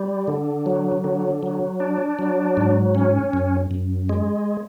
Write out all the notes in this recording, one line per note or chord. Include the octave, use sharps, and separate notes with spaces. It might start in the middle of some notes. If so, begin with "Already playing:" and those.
Already playing: G3
D3
F#3
D3
F#3
D4
F#3
G#2
C#4
F#2
F#2
G#3